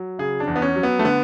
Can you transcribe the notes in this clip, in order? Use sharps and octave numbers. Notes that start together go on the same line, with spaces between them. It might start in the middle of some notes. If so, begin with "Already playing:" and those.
Already playing: F#3
C#3 G#4
D4
E2
B3
C#4
F#3
B3
A3
D3 B3